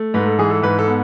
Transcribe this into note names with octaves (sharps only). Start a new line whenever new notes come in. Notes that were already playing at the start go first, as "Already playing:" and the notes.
Already playing: A3
G#2 B4
A4
E3 G#4
A4
G#2 B4
A4
B3